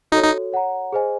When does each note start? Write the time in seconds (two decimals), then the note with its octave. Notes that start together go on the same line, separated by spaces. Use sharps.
0.12 D#4 F#4 A4 C#5
0.23 D#4
0.53 C#5 F#5 A#5
0.92 G#4 C5 D#5 G#5